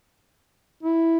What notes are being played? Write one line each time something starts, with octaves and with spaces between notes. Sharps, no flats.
E4